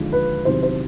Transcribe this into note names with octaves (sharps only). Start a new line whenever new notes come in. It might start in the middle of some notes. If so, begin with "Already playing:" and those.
Already playing: D#2 D3 F3 G#3
B4
E2 C3 D#3 F#3 C5
C5